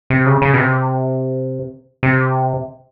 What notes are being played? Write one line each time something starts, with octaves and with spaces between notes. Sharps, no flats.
C3
C#3
C#3
B2
C3
C3